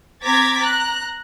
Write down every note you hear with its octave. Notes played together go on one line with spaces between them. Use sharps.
C4 A#5 D6 G#6 A6 B6
A#5 F#6